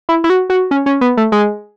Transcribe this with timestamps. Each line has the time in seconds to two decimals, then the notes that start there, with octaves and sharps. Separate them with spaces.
0.09 E4
0.24 E4
0.30 F#4
0.50 F#4
0.71 C#4
0.86 C#4
1.01 B3
1.17 A3
1.32 G#3